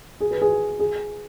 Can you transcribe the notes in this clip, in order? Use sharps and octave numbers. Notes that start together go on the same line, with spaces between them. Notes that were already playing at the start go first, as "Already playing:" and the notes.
G#4
B4
G#4
G#4